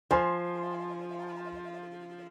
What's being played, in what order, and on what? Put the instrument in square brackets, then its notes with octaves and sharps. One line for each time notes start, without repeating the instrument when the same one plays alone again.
[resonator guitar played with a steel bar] F3 [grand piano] C5 G#5 C6